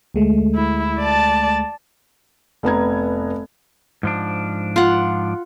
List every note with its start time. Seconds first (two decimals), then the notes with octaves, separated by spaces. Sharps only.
0.14 D2 G#3 A3
0.55 E4
0.99 D5 A5
2.63 F1 B3 A#5 G#6
4.03 G#2 F3 D4
4.76 F4 F#5